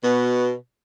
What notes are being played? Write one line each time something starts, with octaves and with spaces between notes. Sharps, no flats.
B2